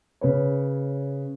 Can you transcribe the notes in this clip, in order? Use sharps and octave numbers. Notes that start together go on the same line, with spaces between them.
C#3 B4 C#5